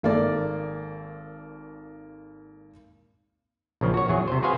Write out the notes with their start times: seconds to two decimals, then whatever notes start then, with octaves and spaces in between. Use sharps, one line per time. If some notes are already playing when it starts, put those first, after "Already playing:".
0.03 G#1 A#3 A4 D5
3.81 A#1 C#3 F3
3.94 F#4 C#5
4.09 E2 F#3 G#4
4.28 C3 C5
4.43 F#4 G#4 B4 C5 F5 G#5